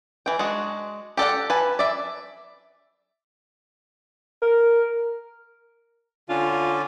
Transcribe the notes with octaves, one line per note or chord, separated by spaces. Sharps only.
E3 G5
G#3 D4 F#4
G4 A4 D5 F#5
B4 G#5 A5
D5 E5
A#4
D3 C#4 D4 F4
F4